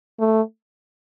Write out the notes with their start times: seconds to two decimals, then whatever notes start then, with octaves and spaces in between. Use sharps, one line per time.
0.19 A3